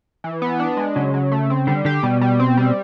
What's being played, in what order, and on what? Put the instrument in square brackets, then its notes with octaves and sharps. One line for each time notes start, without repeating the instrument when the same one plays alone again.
[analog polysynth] E3
B3
D4
G#3
[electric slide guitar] C#3 [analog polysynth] F#3
[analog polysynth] F#3
A3
C4
[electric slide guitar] D3 [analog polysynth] G3
[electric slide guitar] D3 [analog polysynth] G4
[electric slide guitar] B2 [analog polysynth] G3
[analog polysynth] G3
C4
G3